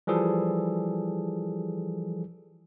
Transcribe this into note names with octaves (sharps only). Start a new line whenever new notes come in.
E3 F3 G3 G#4 A4